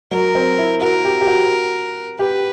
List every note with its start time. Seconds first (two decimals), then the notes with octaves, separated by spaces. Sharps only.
0.11 F#3 A#4
0.35 C4
0.58 E4
0.81 F#4 A#4
1.05 G4
1.21 G4
1.27 F#4
2.19 G4 B4